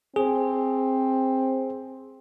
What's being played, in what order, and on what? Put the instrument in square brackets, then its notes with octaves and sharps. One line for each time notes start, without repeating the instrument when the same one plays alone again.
[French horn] C4 [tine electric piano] G#4